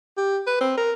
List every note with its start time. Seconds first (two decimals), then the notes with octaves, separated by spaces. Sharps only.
0.17 G4
0.47 B4
0.61 C4
0.78 A#4